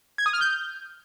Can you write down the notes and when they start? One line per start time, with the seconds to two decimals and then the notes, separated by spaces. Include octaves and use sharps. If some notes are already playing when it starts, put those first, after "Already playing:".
0.18 G#6
0.26 D#6
0.33 F6
0.41 G6